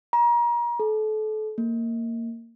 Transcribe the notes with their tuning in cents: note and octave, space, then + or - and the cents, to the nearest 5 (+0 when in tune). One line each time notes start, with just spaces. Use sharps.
A#5 +35
A4 -30
A#3 -20